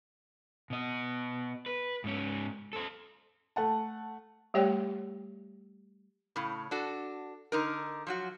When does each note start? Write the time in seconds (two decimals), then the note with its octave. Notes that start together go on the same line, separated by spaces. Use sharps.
0.70 B2 D#5
1.66 B4
2.04 G#2 C#4
2.73 A4 C5
3.56 A3 F#5 A5
4.54 G3 A3 G4 C#5 D5 G5
6.36 A2 C#3
6.71 D4 F#4 A4
7.52 D3 D#4 A#4
8.07 F3 F#3 F#4